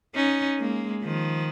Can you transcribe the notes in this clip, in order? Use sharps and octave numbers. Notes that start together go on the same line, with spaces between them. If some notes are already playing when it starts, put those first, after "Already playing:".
C#4 D#4
G#3 A#3
D#3 F3